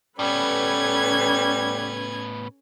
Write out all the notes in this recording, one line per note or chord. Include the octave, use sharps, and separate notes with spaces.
A2 G3 B3 C#4 A4 B4 G#6